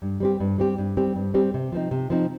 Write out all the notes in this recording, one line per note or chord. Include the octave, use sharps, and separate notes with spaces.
G2
G3 C4 G4
G2
G3 C4 G4
G2
G3 C4 G4
G2
G3 C4 G4
C3
F3 C4 D#4
C3
F3 C4 D#4